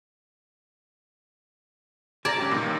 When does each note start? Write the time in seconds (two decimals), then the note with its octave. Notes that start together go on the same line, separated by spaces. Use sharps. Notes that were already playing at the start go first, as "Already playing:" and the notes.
2.25 D3 D5 A5 A#5 G#6 A#6
2.38 C#2 F#2 C#4 G4
2.51 E2 G2 A#2 D#3 A#3